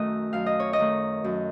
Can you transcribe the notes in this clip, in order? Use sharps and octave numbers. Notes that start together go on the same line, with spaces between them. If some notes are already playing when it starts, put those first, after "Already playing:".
Already playing: F#2 D#3 A3 F#4 A4 D#5
F#2 F5
D#5
C#5
D#5
D#3 A3
F#2